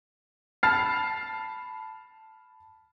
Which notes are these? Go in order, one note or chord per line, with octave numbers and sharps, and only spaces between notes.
A5 B5 F6 A6 C7